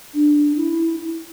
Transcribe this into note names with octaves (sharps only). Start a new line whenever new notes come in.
D4
E4